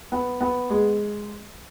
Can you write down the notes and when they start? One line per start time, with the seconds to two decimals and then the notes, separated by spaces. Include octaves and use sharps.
0.12 B3
0.41 B3
0.70 G#3